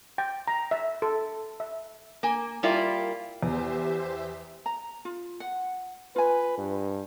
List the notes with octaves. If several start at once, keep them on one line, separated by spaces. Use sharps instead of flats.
G5
A#5
E5
A4
E5
A#3 G#5
G3 A#3 E4 F4 A#4 D5
E2 G4 C5 E5
A#5
F4
F#5
F4 B4 G#5
G2